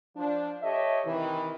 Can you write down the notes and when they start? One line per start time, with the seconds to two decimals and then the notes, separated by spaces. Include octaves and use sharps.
0.17 F3 D4
0.62 G4 A4 C#5 D#5 E5
1.05 C3 D#3 E3